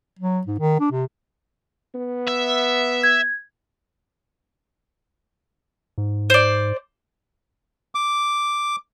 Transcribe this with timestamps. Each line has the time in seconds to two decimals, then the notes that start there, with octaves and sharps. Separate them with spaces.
0.19 F#3
0.46 G#2
0.59 D#3
0.80 D4
0.91 C3
1.95 B3
2.28 E5
3.03 G#6
5.98 G#2
6.30 C5 D5
7.95 D6